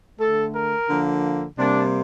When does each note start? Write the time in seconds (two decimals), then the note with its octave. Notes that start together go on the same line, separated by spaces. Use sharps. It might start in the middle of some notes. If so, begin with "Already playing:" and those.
0.20 D3 A3 A4
0.55 A#4
0.90 D3 F3 A#3
1.59 C3 G3 A#3 D4